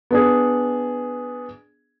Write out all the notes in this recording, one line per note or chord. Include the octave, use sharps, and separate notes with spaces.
B3 D4 G#4